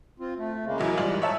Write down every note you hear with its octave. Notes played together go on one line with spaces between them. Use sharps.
C4 F4
A3
C#3 G#3 A#3
E2 F#3 G#3 A#3 E4 A#4
G#2 G3 F4 F#7
D#4 C#5 E5 A5